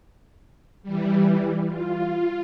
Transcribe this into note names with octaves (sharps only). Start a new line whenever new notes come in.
E3 G3
F4